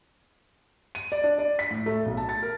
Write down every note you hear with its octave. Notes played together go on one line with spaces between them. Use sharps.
D#7
D5
D4
D5
B6
A2
A3
B1
A5
A6
A#4